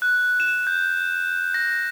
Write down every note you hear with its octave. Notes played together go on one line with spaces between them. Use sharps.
F#6
E7
G6
A#6